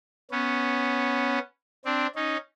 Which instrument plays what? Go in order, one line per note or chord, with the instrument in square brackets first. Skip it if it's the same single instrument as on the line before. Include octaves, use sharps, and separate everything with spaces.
[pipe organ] B3 C#4
C4 D4
C#4 D#4